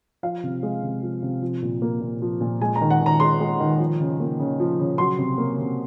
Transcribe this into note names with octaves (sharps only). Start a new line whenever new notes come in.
F3 F5
C3
G#3
C3
F3
C3
F3
A#2
A#3
A#2
F3
A#2
G#3 G#5
A#5
D#3
F#5
D#3
A#5
G#3 C6
G#3
D#3
F3
C#3
A#3
C#3
F3
C#3
F#3 C6
C3
A#3
C3